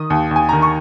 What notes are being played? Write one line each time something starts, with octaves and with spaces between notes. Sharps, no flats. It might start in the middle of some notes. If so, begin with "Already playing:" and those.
Already playing: D#3 D#6
D#2
D#2 G#5
D#3 A#5
C#6